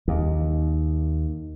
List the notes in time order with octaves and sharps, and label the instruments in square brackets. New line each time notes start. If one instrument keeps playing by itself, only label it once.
[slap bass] D#2